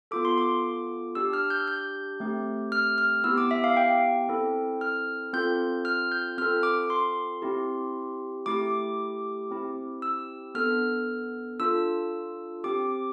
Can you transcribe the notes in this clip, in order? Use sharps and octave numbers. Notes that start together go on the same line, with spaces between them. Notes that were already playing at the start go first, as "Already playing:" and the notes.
B3 F4 A4 D6
C6
D6
D4 G4 E6
F6
G6
G6
A3 C4 G4
F6
F6
B3 E4 G4 E6
D6
E5
F5
G5
C4 E4 A4
F6
C4 F4 A4 G6
F6
G6
C4 F4 A4 F6
D6
C6
C4 E4 G4
A3 E4 G4 D6
C4 E4 G4
E6
B3 D4 A4 F6
D4 F4 A4 E6
C4 G4 D6